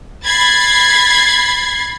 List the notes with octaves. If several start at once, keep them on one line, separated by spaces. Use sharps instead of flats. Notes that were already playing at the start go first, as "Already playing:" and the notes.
B5 G#6 A6 B6 C7